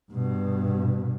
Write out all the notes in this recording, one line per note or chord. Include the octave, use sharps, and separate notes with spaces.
G2 B2